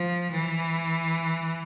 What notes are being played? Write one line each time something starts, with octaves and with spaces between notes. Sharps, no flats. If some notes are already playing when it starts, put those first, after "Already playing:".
Already playing: F3
E3